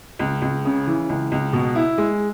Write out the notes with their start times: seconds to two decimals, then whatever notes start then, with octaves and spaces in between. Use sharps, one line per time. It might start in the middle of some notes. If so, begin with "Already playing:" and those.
0.19 C#2
0.42 C#2
0.65 C#3
0.87 E3
1.09 C#2
1.32 C#2
1.53 B2
1.75 E4
1.98 G#3